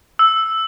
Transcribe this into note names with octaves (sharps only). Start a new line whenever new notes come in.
E6